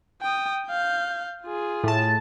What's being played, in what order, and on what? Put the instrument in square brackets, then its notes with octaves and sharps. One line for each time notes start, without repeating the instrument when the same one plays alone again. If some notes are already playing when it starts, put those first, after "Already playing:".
[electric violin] G5 D#6
F5 G6
F4 G#4
[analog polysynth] A2 A5